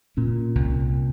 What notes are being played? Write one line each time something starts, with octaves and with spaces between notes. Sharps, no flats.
A#2 C#4
C2